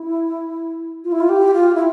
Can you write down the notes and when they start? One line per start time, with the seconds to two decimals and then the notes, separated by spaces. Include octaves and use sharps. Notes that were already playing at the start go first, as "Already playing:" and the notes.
Already playing: E4
1.04 F4
1.12 E4
1.20 F4
1.29 G4
1.54 F4
1.75 E4